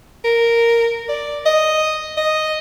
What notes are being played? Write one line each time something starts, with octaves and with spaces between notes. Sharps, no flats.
A#4
D5
D#5
D#5